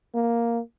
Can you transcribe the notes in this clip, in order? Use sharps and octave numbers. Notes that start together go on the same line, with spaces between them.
A#3